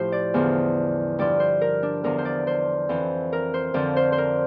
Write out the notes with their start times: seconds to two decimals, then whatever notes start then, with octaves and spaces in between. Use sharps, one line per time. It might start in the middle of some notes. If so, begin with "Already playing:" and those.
Already playing: A2 F3 G4 C5
0.12 D5
0.34 E2 D3 F3
1.19 G2 F3 D5
1.40 C5
1.61 A#4
1.83 D4
2.04 E2 D3 F3 A#4
2.18 C5
2.25 D5
2.47 C5
2.89 F2 E3
3.33 A#4
3.54 C5
3.74 F2 D3 F3 D5
3.96 C5
4.12 C5
4.18 A#4